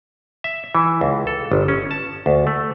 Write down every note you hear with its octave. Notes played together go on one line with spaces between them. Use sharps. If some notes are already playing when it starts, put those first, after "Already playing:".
E5
E3
C#2
A4
G1
C#4
A5
D2
A3